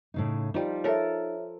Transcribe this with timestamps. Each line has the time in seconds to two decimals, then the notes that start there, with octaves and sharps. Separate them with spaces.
0.14 A2 C#3 D#4
0.54 F3 G3 D#4
0.84 A4 A#4 C#5 E5